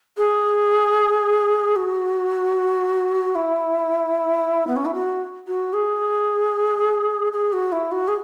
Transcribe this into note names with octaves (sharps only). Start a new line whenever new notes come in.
G#4
F#4
E4
B3
C#4
E4
F#4
F#4
G#4
G#4
F#4
E4
F#4
G#4